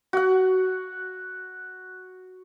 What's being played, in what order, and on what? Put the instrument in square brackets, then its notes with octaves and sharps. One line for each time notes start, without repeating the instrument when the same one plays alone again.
[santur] F#4 F#5